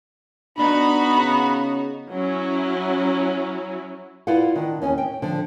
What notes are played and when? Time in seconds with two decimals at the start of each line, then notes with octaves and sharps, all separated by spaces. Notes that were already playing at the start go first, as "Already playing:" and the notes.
0.58 B3 D4 D#4 F#4 B5
1.17 C#3
2.11 F#3 C#4 E4
4.27 E4 F4 B4 D5 F5 F#5
4.55 D#3 D4
4.82 D#2 C#4 D#5 G#5
4.98 G5
5.22 D3 F3